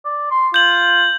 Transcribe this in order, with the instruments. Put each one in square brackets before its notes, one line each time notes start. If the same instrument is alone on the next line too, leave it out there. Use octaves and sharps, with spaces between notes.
[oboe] D5
C6
[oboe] F4 [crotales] G6 F#7